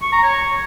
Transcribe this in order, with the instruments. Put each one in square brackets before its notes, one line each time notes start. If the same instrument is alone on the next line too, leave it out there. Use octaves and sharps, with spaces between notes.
[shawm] C#6
A#5
C#5